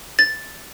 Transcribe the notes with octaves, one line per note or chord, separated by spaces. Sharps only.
A6